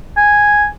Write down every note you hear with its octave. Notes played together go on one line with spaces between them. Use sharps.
G#5